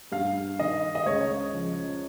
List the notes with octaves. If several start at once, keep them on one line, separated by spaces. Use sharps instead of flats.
G2 F5
D#3 D#5
D#5
C#2 C#5
C#3 F3